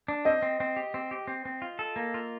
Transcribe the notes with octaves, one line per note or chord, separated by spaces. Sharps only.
D4
C4 D#5
C4
C4
G4
C4
G4
C4
C4
F4
A4
A#3
F4